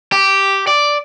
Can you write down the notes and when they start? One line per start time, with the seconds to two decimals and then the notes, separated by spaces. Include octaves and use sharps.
0.12 G4
0.67 D5